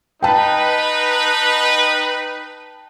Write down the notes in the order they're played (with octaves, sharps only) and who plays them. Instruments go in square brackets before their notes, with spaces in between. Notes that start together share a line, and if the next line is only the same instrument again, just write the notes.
[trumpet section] D#4 B4 [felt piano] G5 A5